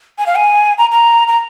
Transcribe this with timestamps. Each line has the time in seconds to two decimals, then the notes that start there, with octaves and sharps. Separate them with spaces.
0.18 G#5
0.26 F5
0.36 G#5
0.78 A#5
0.92 A#5
1.28 A#5